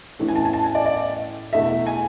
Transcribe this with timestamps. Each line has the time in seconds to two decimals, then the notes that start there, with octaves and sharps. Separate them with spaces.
0.19 A2 E3 A3 C#4 E4
0.28 G#5
0.36 A5
0.45 G#5
0.53 A5
0.64 G#5
0.75 D5
0.86 D5
1.53 E2 B2 A3 E4 E5
1.87 G#5